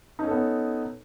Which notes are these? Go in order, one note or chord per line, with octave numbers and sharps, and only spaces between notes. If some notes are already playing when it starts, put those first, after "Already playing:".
B3 C#4 D#4 A4